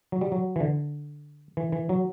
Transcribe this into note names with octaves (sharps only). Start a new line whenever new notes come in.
F#3
G3
F#3
E3
D3
E3
E3
F#3